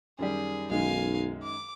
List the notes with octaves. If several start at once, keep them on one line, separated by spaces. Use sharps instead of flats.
F#2 D#3 G3 G#4
B1 F#2 D#3 G#3 F5 G#5
D6